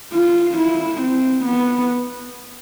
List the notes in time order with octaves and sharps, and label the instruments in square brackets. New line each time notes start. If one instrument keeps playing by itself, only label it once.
[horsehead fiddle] F4
E4
C4
B3